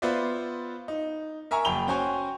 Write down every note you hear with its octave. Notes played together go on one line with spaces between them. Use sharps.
B3 F4 B4 C5 D5 E5
D#4
A#4 E5 G#5 A#5 C#6
F#1 G5 B5 F7 G7
C#4 F#4 C5 G5 G#5 C#6